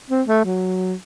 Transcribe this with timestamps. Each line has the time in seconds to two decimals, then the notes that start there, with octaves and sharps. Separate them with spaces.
0.10 C4
0.28 A3
0.45 F#3